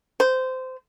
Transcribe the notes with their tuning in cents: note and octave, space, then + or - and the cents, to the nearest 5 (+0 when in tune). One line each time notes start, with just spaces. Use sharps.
C5 -20